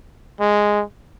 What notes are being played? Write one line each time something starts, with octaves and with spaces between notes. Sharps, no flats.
G#3